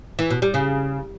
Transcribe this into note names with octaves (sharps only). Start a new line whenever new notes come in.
E3
B2
G3
C#3